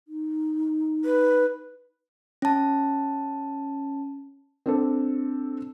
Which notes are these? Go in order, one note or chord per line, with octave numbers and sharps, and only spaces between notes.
D#4
B4
C#4 A5
C4 D4 A4